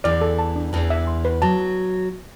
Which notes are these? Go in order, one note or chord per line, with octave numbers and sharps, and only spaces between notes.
E2 E3 D5
A4
A5
D4
E2 E3 A5
E5
C6
B4
F#3 A5